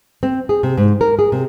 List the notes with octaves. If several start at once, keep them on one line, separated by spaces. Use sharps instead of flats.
C4
G#4
C3
G#2
A#4
G#4
C3